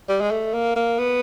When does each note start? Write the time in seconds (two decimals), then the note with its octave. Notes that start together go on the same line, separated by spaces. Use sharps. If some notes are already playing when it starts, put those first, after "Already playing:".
0.09 G3
0.21 G#3
0.31 A3
0.54 A#3
0.76 A#3
0.99 B3